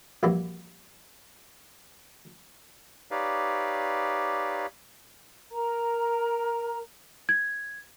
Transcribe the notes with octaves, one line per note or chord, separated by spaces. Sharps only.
A#1 E3 F#3 G3 A#3
D#4 G4 B4 C#5 D5 F5
A#4 A#5
G#6